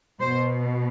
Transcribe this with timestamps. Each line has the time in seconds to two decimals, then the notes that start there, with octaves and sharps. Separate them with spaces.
0.20 B2 C5